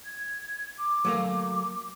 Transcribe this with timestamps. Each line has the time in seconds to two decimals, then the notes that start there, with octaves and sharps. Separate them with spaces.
0.04 G#6
0.78 D6
1.05 F#3 A3 A#3